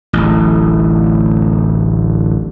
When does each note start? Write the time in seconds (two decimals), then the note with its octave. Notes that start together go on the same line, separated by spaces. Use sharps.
0.13 D1 A1